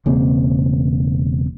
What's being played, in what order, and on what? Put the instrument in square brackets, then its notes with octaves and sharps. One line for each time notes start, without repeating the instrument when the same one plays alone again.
[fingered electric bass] E1 C#3 A#3 C4